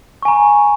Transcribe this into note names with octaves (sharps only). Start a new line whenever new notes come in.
G#5 A#5 C#6